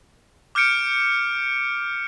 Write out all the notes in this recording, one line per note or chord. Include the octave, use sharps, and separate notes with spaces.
D6 F6 G6 C#7 D7